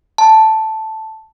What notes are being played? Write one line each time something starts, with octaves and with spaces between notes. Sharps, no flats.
A5